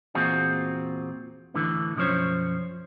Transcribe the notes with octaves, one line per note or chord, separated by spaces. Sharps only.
E2 A#2 C4 F4 F#4 G#4
E2 A2 D3 E3
B1 F#2 F3 C#4 C5 C#5